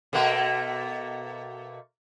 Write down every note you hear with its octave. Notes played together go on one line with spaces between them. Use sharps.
B2 A3 A#3